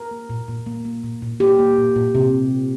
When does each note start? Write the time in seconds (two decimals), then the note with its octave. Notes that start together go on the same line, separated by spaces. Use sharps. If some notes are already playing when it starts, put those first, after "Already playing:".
Already playing: A#4
0.11 A#3
0.30 A#2
0.48 A#2
0.66 A#3
0.85 A#3
1.03 A#2
1.22 A#2
1.40 A#3 G4
1.59 A#3
1.78 A#2
1.96 A#2
2.15 C3